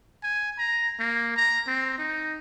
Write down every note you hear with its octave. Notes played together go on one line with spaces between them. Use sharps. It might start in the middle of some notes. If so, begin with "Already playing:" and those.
G#5
A#5
A#3
A#5
C4
D#4